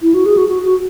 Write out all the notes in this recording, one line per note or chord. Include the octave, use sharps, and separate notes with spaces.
E4
F#4
G#4
F#4
F#4
F#4